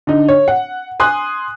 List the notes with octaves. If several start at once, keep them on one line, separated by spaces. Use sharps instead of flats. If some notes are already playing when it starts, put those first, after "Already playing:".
D3 D#4
C#5
F#5
G#5 C6 D#6 F#6